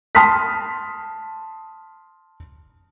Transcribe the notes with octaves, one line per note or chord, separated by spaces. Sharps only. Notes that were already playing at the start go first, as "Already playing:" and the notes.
A5 C6 D#6 F6 B6